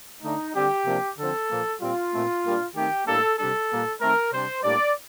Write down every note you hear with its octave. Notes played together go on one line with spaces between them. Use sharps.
D3 A3 D4 D#4
D3 G3 C4 G4
C3 F3 A#3 D4
D3 F3 C4 A4
A#2 F3 A#3
A#2 G3 C4 F4
A#2 A3 C4
A#2 G3 A#3 D4
D#3 A3 C4 G4
A2 G3 A#3 D4 A4
C3 G3 D4 A4
A#2 G3 A#3
D#3 A3 C4 A#4
C3 G3 D4 C5
A2 G3 A#3 D4 D5